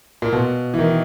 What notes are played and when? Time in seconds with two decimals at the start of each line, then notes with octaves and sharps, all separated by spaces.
0.22 A#2
0.32 B2
0.74 E3
0.79 D#3